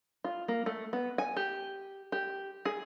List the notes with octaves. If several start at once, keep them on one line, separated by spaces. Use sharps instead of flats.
F4
A#3
A3
B3
G#5
G4
G4
G#4